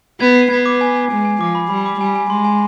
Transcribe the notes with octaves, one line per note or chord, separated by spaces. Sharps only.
B3 G#6
C7
B3 G#6
D6
G#5
G#5
G#3 G#5
G#5
F3 D6
B5
G3 B5
D6
G3 G#5
G#5
G#3 C6
G#5